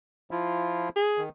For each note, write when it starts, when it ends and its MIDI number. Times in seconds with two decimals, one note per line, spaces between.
0.31 0.89 53
0.31 0.89 64
0.31 0.89 65
0.96 1.22 68
1.18 1.29 51